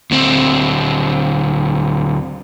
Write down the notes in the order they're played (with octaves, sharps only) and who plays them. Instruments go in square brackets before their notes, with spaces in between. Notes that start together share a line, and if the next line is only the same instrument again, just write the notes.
[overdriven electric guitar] D2 C4